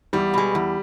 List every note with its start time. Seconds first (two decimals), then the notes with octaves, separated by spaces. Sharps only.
0.13 E2 G3
0.34 B2 G#3
0.55 E2